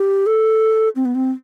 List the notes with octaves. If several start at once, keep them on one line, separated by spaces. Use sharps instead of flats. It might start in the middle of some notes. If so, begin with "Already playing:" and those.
Already playing: G4
A4
C4
B3
C4